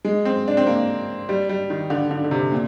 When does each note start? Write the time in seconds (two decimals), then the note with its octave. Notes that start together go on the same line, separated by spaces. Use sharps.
0.05 G#3
0.25 C4
0.48 D4
0.57 C4
0.67 A#3
1.29 G3
1.49 G3
1.70 D#3
1.90 D3
2.11 D3
2.24 D3
2.31 C3
2.52 A#2